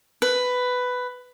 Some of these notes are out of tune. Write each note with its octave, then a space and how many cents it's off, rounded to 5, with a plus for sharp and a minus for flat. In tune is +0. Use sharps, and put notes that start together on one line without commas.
B4 +10